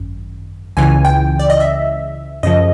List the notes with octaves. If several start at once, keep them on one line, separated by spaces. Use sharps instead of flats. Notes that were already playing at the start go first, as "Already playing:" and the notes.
Already playing: G#1 F#2
C#2 C#3 E3 G#5
G5
D5
D#5
E5
F#2 C#3 F3 D#5